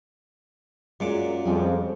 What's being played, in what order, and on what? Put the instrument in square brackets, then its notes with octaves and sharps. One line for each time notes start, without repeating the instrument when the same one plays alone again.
[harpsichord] F#2 A#2 D6 [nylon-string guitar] G#3
[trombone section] F2 [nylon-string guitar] G3 G#4